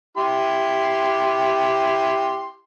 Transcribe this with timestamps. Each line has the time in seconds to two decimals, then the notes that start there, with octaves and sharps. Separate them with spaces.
0.17 E4 G4 C6